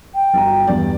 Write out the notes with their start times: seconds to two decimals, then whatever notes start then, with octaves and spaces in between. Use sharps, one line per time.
0.14 G5
0.33 G1 F#4 A#5
0.67 E2 G2 D5